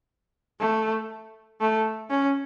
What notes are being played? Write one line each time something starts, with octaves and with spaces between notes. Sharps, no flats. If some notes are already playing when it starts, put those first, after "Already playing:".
A3
A3
C#4